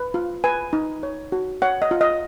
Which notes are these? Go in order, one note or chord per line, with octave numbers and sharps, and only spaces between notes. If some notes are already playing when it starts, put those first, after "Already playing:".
Already playing: B4
F4
B4 G#5
D#4
C#5
F#4
C#5 F#5
D#5
F4
D#5